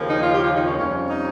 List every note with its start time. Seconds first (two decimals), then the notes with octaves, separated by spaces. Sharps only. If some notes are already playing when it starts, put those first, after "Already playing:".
Already playing: D#2 C#3 F3 A#3
0.10 D#4
0.21 F4
0.33 G4
0.44 F4
0.55 D#4
0.66 C#4
0.77 F2 C3 G3 C#4
1.10 D#4